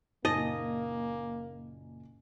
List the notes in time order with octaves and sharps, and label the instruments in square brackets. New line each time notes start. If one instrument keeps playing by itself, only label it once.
[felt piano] F#1 A#2 G#5 [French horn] A#3 [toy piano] D#4 [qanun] D#5